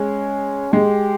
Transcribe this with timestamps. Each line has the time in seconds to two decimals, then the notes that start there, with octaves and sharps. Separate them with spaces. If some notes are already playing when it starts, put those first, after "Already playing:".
Already playing: G#3 C#4
0.72 G#3 G4